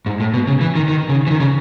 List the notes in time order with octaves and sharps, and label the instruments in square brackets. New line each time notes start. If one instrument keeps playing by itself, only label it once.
[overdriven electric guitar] G#2
A2
B2
C#3
E3
D#3
D#3
C#3
E3
D#3
C#3